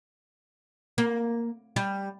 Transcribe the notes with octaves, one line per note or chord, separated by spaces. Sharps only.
A#3
G3